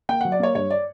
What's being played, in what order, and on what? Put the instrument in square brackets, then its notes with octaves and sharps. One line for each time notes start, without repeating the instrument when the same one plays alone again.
[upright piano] A#3 G5
F#3 F#5
D5
A#3 C#5
G2 C#5
D5